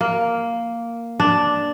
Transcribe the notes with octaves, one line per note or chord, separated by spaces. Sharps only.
A#3
D4